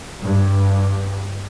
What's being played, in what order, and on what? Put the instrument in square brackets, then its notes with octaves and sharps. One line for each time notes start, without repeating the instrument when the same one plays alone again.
[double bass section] G2